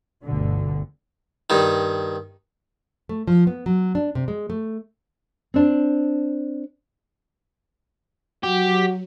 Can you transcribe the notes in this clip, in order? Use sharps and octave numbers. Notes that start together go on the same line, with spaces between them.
G1 D2 G2 B2 D3
G2 D#3
A3
F3
B3
F#3
D4
C3
G#3
A3
C4 D4
F#3 F#4 G4